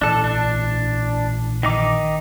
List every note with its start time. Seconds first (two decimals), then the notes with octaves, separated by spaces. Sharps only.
0.01 A#1 E3 D4 A4
0.24 D4
1.63 D#3 D#4 D6